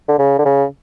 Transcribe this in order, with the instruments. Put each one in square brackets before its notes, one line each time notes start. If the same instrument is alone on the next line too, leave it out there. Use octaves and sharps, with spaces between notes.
[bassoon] D3
C#3
D3
C#3